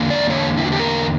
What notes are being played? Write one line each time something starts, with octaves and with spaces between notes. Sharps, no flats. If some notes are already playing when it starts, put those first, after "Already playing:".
Already playing: E2 D3 A#3
D5
C#5
E4
F#4
G4
A#4